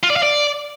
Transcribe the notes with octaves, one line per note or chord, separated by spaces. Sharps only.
F4
D5
F5
D5